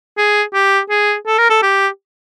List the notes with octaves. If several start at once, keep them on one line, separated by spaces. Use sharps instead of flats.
G#4
G4
G#4
A4
A#4
A4
G4